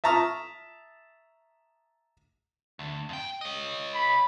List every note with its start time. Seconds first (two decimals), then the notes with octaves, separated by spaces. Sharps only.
0.04 E5 A5 A#5 C#6 D#6 F6
2.79 D2
3.09 F2 G5
3.41 C#5 D#5
3.94 B5